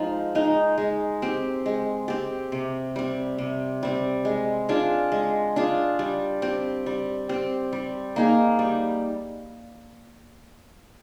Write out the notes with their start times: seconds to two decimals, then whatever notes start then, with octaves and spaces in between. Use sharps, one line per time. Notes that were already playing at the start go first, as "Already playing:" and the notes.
Already playing: F3 G#3 D#4
0.35 G#3 D#4
0.78 G#3
1.22 C4 G4
1.66 G#3
2.08 C4 G4
2.52 C3
2.96 G3 C4
3.38 C3
3.83 G3 C4
4.25 G#3
4.69 D4 F4 G#4
5.12 G#3
5.56 D4 F4 G#4
5.99 G3
6.42 C4 G4
6.86 G3
7.29 C4 G4
7.73 G3
8.16 A#3 D#4 G#4
8.59 G3